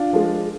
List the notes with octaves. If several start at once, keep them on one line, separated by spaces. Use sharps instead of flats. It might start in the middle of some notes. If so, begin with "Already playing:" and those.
Already playing: D4 F4
F3 G#3